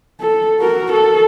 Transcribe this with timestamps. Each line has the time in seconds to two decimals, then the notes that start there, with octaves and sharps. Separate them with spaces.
0.20 A4
0.60 F#4 A#4
0.92 A4